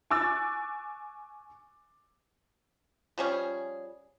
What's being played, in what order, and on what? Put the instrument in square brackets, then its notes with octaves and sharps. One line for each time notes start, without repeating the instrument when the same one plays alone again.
[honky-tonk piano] G#5 C#6 D6 E6 F#6 A6
[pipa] F3 G3 C#4 G#4